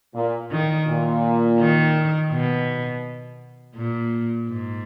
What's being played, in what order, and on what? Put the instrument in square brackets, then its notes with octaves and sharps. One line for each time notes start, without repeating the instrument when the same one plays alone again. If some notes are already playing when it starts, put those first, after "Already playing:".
[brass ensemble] A#2
[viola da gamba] D#3
[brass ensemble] A#2
[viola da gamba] D#3
B2
A#2
G#2